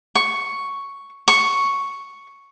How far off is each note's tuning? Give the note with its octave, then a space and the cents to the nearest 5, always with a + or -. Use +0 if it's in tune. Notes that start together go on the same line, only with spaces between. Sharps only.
C#6 +5
C#6 +0